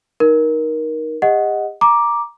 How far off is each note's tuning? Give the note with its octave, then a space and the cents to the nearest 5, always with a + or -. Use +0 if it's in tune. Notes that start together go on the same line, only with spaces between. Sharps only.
D#4 +0 A#4 +20
G4 +45 D#5 +5 F#5 +0
A#5 +15 D6 +0